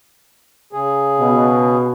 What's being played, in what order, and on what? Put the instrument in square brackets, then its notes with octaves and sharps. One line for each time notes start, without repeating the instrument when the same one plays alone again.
[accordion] C#3 G#4
[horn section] B2